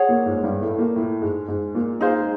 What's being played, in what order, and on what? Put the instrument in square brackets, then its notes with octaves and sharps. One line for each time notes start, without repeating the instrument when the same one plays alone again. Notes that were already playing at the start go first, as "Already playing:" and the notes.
Already playing: [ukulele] G#4 C#5 F#5
[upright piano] A#2 A#3
G#2 G#3
G#3
G2 G3
A2 A3
A#2 A#3
A2 A3
G#2 G#3
G#2 G#3
A#2 A#3
[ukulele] D#4 G#4 C5 F5
[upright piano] G#3